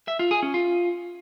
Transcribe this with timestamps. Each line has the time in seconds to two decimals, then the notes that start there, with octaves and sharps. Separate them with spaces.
0.08 E5
0.19 F4
0.31 G#4
0.43 C#4
0.54 F4